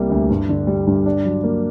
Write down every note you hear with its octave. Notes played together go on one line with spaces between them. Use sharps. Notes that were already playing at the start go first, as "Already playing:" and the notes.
Already playing: C2 C3 G3 A#3
D2
G2
D3
G3
G2
D4
F#3
A#3